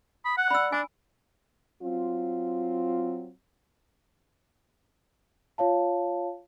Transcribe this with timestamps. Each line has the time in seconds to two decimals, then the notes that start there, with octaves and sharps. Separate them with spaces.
0.25 B5 D#6
0.37 F#5 F#6
0.50 D5 B5 E6
0.72 D4 G#5
1.82 F#3 C4 F4
5.58 F4 C#5 F5 A5